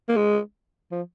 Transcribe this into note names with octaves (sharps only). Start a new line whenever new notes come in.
A#3
G#3
F3